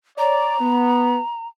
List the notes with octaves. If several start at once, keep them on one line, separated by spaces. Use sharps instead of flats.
C#5 D5 A#5
B3